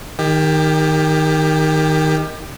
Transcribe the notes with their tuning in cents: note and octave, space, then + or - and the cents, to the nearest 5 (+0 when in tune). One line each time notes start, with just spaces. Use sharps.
D#3 +0 G4 +25